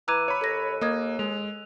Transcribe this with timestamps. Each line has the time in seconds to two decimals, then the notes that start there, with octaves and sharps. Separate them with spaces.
0.08 E3 A#5 D6 E6 F#6 G#6 D#7
0.28 C#5 B5
0.41 D#2 A4 A#6
0.81 A#3 D#5 D#6 G#6
1.19 G#3 F7